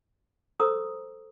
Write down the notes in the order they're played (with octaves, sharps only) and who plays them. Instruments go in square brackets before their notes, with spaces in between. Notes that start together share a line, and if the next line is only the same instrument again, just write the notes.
[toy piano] A4 C5 A#5 C#6 D#6 E6